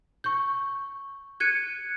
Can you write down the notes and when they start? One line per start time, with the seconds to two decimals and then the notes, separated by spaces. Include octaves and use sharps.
0.24 C#6 G6
1.40 F#6 G#6 C#7 D#7